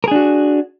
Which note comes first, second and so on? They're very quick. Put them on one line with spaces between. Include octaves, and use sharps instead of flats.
A#4 G#4 D4 F#4